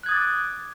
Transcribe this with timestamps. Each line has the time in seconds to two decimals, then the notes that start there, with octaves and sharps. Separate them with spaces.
0.03 F#6
0.06 G#6
0.09 D#6
0.11 A6
0.14 D6